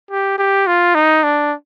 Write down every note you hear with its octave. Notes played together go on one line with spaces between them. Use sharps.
G4
G4
F4
D#4
D4